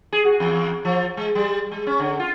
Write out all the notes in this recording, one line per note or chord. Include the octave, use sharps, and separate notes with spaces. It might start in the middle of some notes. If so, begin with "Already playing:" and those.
G#4
F#4
E2
F3
G#3
G3
G#3
C#4
D3
F4